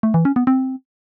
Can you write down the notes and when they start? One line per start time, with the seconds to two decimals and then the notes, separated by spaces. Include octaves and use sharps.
0.03 A3
0.14 E3
0.25 C#4
0.36 B3
0.47 C4